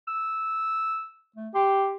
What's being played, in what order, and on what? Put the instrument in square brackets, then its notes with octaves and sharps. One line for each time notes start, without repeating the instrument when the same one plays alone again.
[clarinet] E6
A3
[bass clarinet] G4 [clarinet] C6